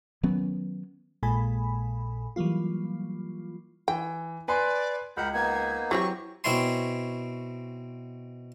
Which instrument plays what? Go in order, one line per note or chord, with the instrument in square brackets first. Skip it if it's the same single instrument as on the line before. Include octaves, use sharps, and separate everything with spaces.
[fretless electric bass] D#3 F#3 B3 C#4
[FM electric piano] A#1 A#2 G#3 A4 G#5 B5
E3 F#3 G3 A#3 F4
[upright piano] E3 [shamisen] G5
[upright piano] B4 G#5 C6 [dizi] D5
[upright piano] C#2 [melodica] A#4 F#5 B5 [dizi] G6
[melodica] A#3 B3 D#4 [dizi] G#6
[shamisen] E3 C4 G4 [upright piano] F#3 [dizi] C#6
[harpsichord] B2 C4 E4 C#5 G#5 C6